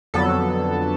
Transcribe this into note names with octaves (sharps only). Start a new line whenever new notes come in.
F2 D3 F#3 B3 A4